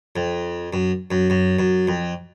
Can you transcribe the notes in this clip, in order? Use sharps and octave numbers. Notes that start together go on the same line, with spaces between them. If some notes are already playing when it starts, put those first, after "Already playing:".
F2
F#2
F#2
F#2
F#2
F2